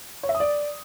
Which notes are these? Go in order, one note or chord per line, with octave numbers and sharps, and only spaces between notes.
C#5
E5
D#6
D5